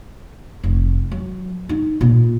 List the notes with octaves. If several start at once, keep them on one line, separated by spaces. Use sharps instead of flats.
F1
F#3
D#4
A#2